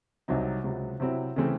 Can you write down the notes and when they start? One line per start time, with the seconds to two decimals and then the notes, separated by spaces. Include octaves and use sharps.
0.28 C2 C3 F#3 C4 D#4
0.64 C#2 C3 F#3
1.00 C3 F#3 C4 E4
1.36 C#3 E3 A3 C4